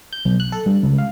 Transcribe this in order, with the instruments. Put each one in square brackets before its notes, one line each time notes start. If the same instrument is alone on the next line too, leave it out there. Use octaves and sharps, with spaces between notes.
[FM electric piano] G6
B1
F#6
A4
G2
C#2
F5